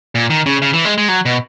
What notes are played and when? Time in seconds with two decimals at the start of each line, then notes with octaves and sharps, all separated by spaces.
0.15 A#2
0.30 D#3
0.46 C#3
0.62 C#3
0.73 E3
0.85 G#3
0.98 G#3
1.08 F#3
1.25 B2